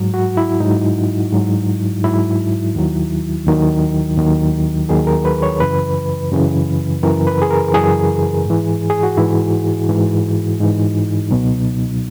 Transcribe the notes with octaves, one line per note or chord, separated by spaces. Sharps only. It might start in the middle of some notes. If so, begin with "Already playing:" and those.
Already playing: G#2 F#3
F#4
E4
G#2 F#3 D#4
G#2 F#3
G#2 F#3 E4
D#2 D#3 F#3
D#2 D#3 F#3
D#2 D#3 F#3
D#2 D#3 F#3 G#4
A#4
B4
C#5
F#2 C#3 E3 B4
F#2 C#3 E3
F#2 C#3 E3 A#4
B4
G#4
A#4
F#2 C#3 E3 G#4
G#2 E3
G#4
F#4
G#2 E3 E4
G#2 E3
G#2 E3 D#4
C#2 B2 F#3